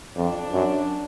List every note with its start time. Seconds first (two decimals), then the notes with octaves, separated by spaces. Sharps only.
0.16 F2 D4
0.52 F#2